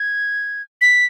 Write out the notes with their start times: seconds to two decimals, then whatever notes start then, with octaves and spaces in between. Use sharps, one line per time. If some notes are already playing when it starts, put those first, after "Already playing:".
Already playing: G#6
0.81 B6